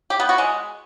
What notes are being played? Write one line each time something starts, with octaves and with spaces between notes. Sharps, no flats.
G4
B3
F#4
G#3